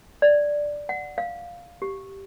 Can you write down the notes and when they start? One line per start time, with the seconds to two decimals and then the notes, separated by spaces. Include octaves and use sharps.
0.22 D5
0.89 F#5
1.18 F5
1.82 G4